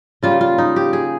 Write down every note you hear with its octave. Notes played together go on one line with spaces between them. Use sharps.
C#3 G3 A#3 F4
F4
D#4
G4
G#4